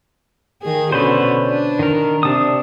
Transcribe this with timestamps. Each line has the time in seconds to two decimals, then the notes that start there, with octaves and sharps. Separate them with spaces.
0.62 D#3 G#4
0.92 B2 D3 C#4 B4 C5
1.45 D4
1.79 D#3 A#4
2.23 C3 D4 A5 D#6